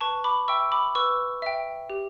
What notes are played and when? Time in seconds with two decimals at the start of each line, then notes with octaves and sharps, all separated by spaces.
0.01 B4 A5 C#6
0.24 B5 D6
0.48 E5 G5 C#6 E6
0.72 B5 D6
0.95 B4 C#6 E6
1.42 E5 G5
1.90 G4